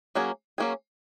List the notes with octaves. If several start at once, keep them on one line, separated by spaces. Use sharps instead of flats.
F#3 A#3 C#4 G#4
F#3 A#3 C#4 G#4